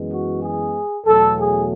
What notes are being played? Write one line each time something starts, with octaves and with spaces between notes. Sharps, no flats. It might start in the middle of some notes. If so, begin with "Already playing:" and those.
Already playing: F#2 E3 G#3 B3
F#4
G#4
E2 B2 F#3 A3 A4
G#4